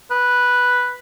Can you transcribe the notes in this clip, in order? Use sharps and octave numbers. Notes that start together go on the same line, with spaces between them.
B4